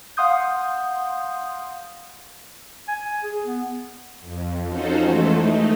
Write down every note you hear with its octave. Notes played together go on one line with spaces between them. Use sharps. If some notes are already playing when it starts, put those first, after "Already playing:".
F5 F#5 C6 D#6 G6
G#5
G#4
B3
F2
C#4 D#4 F4 F#4 A4 C5
E3 G#3 A3 A4
A3 D#4